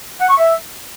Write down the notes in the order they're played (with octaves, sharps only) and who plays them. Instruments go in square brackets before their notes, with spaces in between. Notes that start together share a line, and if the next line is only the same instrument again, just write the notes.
[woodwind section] F#5
C#6
E5